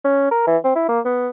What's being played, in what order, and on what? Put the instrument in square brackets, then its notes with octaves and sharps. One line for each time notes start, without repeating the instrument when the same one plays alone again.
[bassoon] C#4
A#4
E3
C4
E4
A#3
B3